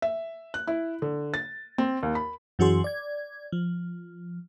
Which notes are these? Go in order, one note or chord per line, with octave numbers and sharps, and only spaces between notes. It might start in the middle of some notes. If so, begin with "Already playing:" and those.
E5
F#6
E4
D3
A6
C4
D#2
B5
F#2 E3 C#4 F#4 G#4 C6
D5 G#6
F3